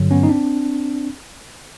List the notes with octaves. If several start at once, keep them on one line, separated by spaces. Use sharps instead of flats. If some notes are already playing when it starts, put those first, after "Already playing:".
Already playing: G2 D3 F#3
B3 C#4
D#4
C4 D4